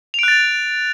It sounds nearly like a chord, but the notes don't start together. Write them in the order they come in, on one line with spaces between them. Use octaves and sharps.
F7 D7 F#6 A6